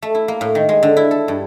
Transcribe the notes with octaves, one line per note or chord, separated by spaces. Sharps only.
A3
E4
A#3
A2
D#3
G#3
D3
E4
A4
G2